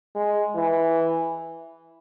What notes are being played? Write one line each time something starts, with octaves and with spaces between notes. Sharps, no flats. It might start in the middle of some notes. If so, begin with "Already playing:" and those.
G#3
E3